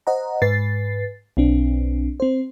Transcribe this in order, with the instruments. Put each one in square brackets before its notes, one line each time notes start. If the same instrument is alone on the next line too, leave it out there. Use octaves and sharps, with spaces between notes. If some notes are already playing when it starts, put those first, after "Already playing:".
[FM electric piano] C5 D#5 F#5 A#5
G#2 B4 A6 C7
B1 C4 D4
C4 C5